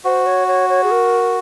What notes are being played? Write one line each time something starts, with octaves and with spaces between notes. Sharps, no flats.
F#4 C5
C#5
C#5
C#5
G#4
A#4